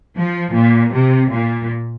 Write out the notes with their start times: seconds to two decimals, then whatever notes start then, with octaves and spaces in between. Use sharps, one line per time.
0.16 F3
0.55 A#2
0.93 C3
1.31 A#2